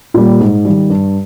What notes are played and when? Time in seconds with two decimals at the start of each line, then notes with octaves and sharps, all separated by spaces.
0.14 A#2 G3 A#3
0.40 G#2
0.65 D#3 G3
0.90 G2